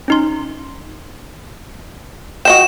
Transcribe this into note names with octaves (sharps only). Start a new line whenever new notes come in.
C#4 D#4 C6
F#4 D#5 G5 E7